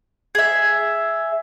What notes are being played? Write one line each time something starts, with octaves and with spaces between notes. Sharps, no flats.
G#4 E5